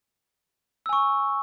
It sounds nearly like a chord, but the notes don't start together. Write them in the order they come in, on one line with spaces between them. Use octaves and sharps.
E6 G#5 C#6